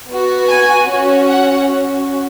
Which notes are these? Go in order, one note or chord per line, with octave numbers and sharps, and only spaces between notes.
B3 F#4
G#5
C#4 F#4
F#5
C#4 F#4